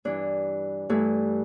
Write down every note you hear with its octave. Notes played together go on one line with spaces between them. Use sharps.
G2 E3 D4
G2 E3 A3